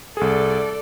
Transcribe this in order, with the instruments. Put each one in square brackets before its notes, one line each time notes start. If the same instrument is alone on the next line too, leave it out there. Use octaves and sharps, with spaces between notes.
[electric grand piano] C2 G#4 [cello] A4 D5